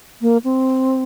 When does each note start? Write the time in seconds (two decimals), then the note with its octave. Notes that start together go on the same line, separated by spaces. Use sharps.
0.21 A#3
0.44 C4